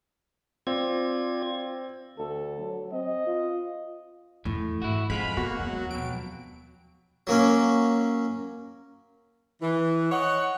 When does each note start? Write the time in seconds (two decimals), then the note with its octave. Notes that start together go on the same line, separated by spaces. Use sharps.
0.67 C4 F4 D5 G#6
2.18 D2 A4
2.59 F#3
2.92 C4 D#5
3.26 F4
4.45 E2 A2 E3
4.82 G#2 E4 F#4
5.10 F2 G#2 G#3 A3 F4 B5
5.37 A#3 B3 F#4
5.60 D#2 F#3
5.91 F2 B2 D7
7.27 F#3 A#3 C#4
9.62 E3
10.12 C#5 D#5 F#5